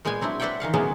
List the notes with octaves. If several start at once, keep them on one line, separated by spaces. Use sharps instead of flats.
A#2 G#3 B3 G5 G#5
F#3 C4 D4 E4
B4 C5 D5 E5 F#5 G5
D#3 E3 F5 F#5
C#3 F#3 G#3 A#3 B3 G#4